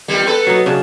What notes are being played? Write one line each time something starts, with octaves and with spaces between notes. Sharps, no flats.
E2 G3 A#3
B3 A4 B4
F#3 D#4
C#3 D4